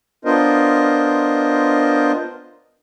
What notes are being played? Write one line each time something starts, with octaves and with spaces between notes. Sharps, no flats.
B3 D4 F4 A#4 C5 D#5